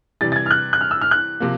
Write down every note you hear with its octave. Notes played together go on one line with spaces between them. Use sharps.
C3 E3 G3 A6
A6
G#6
F6
F#6
F#6
F6
E6
F6
F#6
C3 F3 A#3